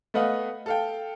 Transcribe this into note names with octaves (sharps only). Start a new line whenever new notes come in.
A3 B3 B4 D#5 F5 F#5
A4 F5 G5